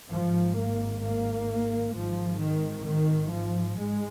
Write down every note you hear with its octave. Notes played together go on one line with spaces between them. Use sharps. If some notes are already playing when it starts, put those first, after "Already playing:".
G#1 G#2 F3
A#3
A#3
G#1 G#2 F3
D#3
D#3
F3
G#2 G#3